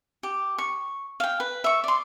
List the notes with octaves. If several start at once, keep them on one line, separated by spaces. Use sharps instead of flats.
G4
C#6
F5 G5
B4
E5 C#6
D5 C6